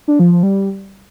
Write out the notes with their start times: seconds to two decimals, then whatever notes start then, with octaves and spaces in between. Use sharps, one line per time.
0.08 D4
0.19 F3
0.31 F3
0.43 G3